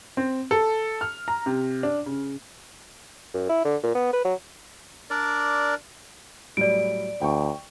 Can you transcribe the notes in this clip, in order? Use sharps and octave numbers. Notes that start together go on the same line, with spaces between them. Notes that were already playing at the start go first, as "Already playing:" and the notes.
C4
A4
F6
A#5
C3
D4
C#3
F#2
E4
D3
A#2
B3
B4
F#3
D4 A#4 D5
A2 F#3 G3 D5 D7
D2 G5 C#6